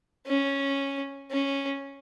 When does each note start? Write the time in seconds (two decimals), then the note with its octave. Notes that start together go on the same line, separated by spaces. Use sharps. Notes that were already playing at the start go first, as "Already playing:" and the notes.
0.27 C#4
1.31 C#4